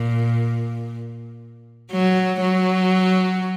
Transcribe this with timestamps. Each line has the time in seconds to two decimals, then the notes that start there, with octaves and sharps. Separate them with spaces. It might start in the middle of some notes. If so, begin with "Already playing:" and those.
Already playing: A#2
1.92 F#3
2.41 F#3